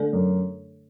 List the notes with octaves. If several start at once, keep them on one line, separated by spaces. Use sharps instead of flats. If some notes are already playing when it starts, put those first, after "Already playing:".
Already playing: D3 A3 D4 A4 D5
F#2